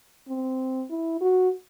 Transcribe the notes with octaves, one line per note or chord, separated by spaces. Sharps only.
C4
E4
F#4